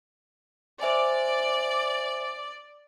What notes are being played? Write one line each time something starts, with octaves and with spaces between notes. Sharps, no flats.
C5 D5 E5 G#5